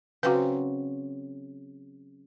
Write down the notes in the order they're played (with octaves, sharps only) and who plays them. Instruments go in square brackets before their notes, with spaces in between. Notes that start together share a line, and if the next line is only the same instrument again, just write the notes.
[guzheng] C#3 F#3 C4 [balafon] F#4 B4